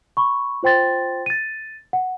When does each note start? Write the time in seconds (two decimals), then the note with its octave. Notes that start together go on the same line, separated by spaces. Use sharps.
0.17 B5 C#6
0.63 F4 C5 G5 C6 A6
1.26 A6 D#7
1.93 F#5